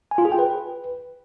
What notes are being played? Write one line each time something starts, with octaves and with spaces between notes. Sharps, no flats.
G#5
F4
G#4
G5
B4